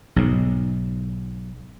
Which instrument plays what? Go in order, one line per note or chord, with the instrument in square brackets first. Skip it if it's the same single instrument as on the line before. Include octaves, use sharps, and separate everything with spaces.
[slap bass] B1 G#2